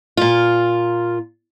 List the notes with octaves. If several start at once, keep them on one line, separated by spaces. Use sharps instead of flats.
A#2 F4